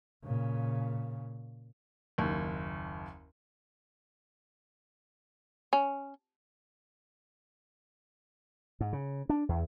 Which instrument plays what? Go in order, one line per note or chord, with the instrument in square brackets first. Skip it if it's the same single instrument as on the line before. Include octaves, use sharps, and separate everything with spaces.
[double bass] A#2 C#3
[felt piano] F#1 D#2
[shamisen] C#4
[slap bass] G#2
C#3
D4
E2